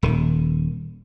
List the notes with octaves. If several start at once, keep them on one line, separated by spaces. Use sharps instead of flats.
D#1 D#3